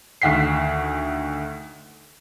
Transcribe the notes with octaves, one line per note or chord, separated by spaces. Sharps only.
D2 D#3 F#5 B6 C7